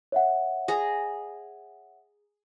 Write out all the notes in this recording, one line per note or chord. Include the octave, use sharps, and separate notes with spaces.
C#5 E5 F#5
G#4 A#5